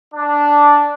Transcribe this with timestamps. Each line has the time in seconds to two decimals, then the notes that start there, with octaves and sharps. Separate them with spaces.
0.14 D4